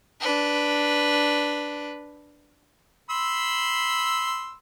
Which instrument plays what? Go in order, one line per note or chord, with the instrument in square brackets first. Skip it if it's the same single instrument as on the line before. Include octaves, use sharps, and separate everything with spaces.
[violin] D4 B4
[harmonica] B5 C6 E6